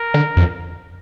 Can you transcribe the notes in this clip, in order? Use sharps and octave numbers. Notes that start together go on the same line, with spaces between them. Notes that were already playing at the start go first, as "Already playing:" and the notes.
Already playing: A#4
D3
F2